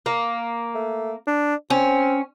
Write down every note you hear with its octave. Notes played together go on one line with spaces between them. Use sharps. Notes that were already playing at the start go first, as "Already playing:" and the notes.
A#3
A3
D4
C4 C#4